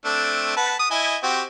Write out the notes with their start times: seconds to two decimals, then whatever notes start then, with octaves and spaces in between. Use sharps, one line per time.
0.05 A3 C4 D4
0.56 B4 F#5 A5
0.79 D#6
0.91 E4 D#5 G#5
1.23 C4 F#4 G4